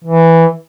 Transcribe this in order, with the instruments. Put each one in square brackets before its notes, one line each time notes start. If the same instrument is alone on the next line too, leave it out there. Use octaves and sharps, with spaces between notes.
[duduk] E3